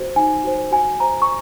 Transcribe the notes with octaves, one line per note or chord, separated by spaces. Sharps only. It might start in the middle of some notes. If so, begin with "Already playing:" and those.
Already playing: F#4 C5
D#4 G#5
F#4 C5
F#4 G#5
C5 A#5
C#6